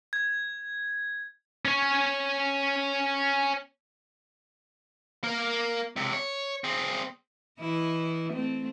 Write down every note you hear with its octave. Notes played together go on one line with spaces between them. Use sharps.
G#6
C#4 C#5
A#3 A#4
C#2 C3
C#5
C4 G#4
E3 E4 D#5
A3 C4